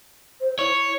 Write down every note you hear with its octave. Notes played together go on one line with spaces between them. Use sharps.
C5
E4 C#5